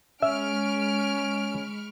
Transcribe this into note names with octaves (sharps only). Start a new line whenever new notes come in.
G#3 C#4 E5 B5 C#6 F6 D7